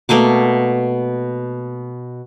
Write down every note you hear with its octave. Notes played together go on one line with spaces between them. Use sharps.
B2 A3 A#3 D6